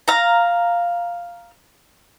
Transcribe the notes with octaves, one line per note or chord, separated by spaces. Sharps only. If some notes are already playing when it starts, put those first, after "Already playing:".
F5 A#5